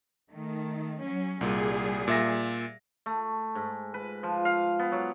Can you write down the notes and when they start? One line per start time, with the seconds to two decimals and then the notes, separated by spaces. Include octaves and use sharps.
0.31 D#3 A3
0.99 F#3 C#4
1.41 C2 A#2 G3 G#4
2.08 A#2 E5 A#6
3.06 A3
3.55 G#2
3.94 B4
4.23 F3
4.45 F5
4.79 B3
4.92 F#3